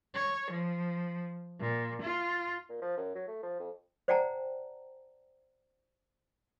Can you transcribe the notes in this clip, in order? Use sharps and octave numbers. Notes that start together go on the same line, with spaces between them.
C#5
F3
A#2
F4
A#2
F3
F#2
F#3
A3
F3
F2
C5 D5 F#5 G5 A5 A#5